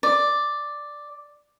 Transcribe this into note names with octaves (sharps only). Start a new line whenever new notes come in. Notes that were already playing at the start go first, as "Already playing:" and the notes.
D5